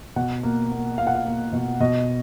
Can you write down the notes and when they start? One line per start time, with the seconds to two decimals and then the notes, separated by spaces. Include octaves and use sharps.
0.16 B2 F#5
0.43 A#3
0.71 A#3
0.98 A#3 F5
1.07 F#5
1.15 F5
1.25 A#3
1.53 B2
1.80 B2 D#5